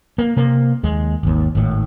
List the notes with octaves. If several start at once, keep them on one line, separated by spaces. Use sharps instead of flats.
A#3
C3 A#3
D#2 G#3
G#1 D#2
G#1 A2